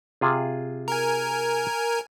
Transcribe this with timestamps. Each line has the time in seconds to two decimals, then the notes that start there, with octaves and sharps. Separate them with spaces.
0.21 C3 F4 G#4
0.88 A#4 G#5